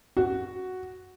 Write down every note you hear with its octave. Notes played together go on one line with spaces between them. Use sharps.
F#4